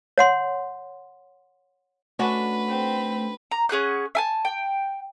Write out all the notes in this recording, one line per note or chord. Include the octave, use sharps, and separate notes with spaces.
C#5 F#5 C6
A3 C#4 D4 F#4 B4
C4
A#5
C#4 G#4 F#5 F#6
E5 G#5 A5
G5